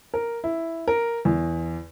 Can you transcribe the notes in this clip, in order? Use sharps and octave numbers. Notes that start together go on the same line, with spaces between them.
A#4
E4
A#4
E2